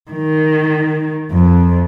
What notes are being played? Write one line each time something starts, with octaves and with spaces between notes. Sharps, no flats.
D#3
F2